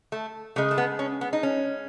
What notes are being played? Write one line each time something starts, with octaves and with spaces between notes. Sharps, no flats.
A3
C#3 G#3 A3
A3
B3
C#4
B3
D#4
C#4